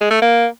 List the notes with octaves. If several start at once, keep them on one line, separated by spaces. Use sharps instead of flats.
G#3
A3
A#3